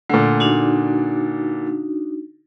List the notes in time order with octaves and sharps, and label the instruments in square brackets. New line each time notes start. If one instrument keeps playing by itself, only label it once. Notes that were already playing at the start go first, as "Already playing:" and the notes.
[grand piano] A#2 D3 [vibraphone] A3
[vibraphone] D4 D#4 F#4